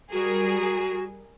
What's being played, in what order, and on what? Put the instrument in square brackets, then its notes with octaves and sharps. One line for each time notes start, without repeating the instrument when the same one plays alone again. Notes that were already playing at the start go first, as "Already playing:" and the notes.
[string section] G3 G#4 A#4 [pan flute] F#4